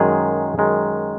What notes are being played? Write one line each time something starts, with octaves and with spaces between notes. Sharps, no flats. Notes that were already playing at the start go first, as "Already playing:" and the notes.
Already playing: F#2 D#3 G#3 G#4
F#2 D#3 G#3